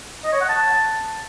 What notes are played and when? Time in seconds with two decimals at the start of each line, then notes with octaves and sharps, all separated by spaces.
0.24 D#5
0.32 C#5
0.40 F#5
0.49 A5